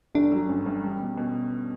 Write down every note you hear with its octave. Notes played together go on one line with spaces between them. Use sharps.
G1 D4
F#3
G2 C#4
G2
G3
B2
B2